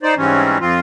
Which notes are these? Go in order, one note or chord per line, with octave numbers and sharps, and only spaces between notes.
D#4 C5 D5
G#2 E3 G3 C4 C#4
F2 F3 C4 F4